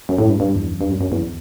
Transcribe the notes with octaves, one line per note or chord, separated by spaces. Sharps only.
F#2
A2
G2
G2
E2
F#2
G2
F#2
F#2
E2